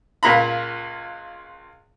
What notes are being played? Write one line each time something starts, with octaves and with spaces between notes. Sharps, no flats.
C#2 A#2 A#5 B5